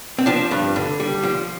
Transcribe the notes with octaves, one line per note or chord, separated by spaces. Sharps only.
C4
F3 D4
G2
D3
G3
F3